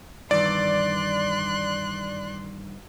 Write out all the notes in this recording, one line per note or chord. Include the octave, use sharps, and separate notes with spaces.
G2 D#3 E3 D5 C6 F#6